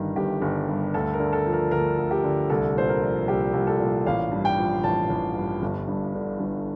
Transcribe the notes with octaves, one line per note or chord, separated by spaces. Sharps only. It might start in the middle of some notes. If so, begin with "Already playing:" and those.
Already playing: G1 G2 D#3 A#4
G1 G4
G1
G2
D2 A4
A#4
D3
A4
F3
A#4
D2 A#4
D2
G4
D3
C2 A4
A#2 C5
A#4
F3
C2 G4
C2
A4
A#2
A1 F5
G2
G5
F3
A1 A5
A1
G2
G1
G2
D3
G1